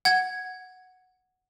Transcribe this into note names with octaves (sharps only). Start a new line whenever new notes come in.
F#5 G#6